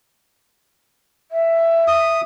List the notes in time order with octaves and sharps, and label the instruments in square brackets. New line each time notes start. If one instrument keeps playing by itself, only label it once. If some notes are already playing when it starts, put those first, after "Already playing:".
[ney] E5
[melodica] D#6